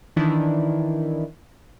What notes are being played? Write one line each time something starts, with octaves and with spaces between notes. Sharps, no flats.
D#3 E3 D4 E4